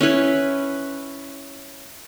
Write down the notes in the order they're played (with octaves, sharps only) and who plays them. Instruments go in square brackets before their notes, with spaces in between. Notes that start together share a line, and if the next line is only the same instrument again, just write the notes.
[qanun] C#4 E4 B4